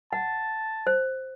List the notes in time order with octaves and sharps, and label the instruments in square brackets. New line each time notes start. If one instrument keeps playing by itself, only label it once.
[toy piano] F#5 [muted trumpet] A5
[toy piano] C5